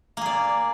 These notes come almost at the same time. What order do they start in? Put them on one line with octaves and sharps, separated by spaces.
A#3 G#4 D5